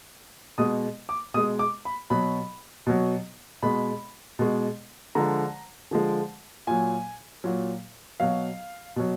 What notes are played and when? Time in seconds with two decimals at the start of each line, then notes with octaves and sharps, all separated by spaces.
0.58 B2 G#3 D#6
1.09 D6
1.34 B2 D#6
1.37 G#3
1.59 D6
1.85 B5
2.10 B2 F#3 B5
2.87 B2 F#3
3.63 B2 G#3 B5
4.39 B2 G#3
5.15 D3 F3 G#3 A#5
5.91 D3 F3 G#3
6.67 A#2 F#3 G#5
7.44 A#2 F#3
8.20 B2 F#3 F5
8.96 B2 F#3